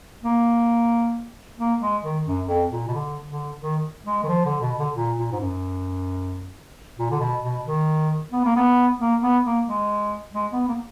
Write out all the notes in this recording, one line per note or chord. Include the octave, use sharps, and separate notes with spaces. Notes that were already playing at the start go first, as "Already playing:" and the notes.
A#3
A#3
G#3
D#3
F#2
F2
A#2
B2
D3
D3
D#3
G#3
D#3
F3
D3
B2
D3
A#2
A#2
G#2
F#2
A#2
D3
B2
B2
D#3
B3
A#3
B3
A#3
B3
A#3
G#3
G#3
B3
A#3